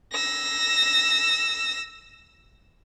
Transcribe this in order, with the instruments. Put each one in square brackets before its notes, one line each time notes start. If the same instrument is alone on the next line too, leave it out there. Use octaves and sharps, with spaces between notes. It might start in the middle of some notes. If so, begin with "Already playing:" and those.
[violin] E6 A#6